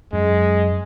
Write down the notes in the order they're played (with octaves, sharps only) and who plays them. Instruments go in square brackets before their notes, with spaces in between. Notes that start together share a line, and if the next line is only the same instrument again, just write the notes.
[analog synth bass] F#2 [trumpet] G#3